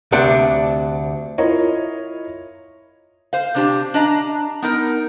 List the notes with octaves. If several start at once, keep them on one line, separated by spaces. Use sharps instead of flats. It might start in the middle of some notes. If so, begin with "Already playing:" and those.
D2 C3 D4 F#5
E4 F4 A#4 C#5 D#5
C5 F5
C3 D4 G4
D4 D#5 A#5
B3 D#4 A#4